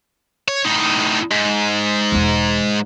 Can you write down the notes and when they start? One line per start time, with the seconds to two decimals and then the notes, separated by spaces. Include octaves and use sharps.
0.48 C#5
0.65 A2 D#4
1.31 G#2
2.12 E1 E2